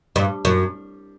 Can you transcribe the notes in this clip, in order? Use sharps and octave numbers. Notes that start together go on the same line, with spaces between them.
G2
F#2